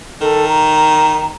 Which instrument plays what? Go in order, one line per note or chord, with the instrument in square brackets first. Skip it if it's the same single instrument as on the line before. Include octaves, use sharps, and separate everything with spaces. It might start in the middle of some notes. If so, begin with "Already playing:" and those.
[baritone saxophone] D#3 [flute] A4
[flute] A#5